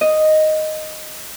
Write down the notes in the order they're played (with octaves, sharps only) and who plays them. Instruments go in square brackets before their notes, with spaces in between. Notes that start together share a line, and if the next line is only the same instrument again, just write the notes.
[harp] D#5